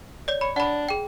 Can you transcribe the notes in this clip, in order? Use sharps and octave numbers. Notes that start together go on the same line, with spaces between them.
C#5 D5
C#5 B5
D4 F#5 B5
G#4 G5